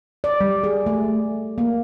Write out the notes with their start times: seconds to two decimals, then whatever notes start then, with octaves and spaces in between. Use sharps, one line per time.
0.24 D5
0.41 G3
0.64 G#4
0.86 A3
1.58 A#3